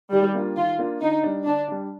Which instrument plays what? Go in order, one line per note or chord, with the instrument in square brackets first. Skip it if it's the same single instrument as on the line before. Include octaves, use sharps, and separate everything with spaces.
[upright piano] D#3 [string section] G3
[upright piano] A#3 D4 F4
[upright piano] D#3 [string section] F4
[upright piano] A#3 D4 F4
[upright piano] D3 [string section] D#4
[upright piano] G3 D4
[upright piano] D3 [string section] D4
[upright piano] G3 D4